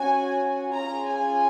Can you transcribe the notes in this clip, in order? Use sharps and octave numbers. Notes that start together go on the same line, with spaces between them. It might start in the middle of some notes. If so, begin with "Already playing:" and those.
Already playing: C#4 F#4 G#5
C#4 F4 G#4 A#5
G#5